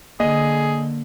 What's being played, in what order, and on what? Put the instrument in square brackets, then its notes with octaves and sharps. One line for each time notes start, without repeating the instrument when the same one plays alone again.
[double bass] D3 [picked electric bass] A#3 [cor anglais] G#4 [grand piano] D#5